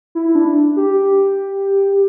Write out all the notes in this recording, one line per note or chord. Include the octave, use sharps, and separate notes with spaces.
E4
D4
G4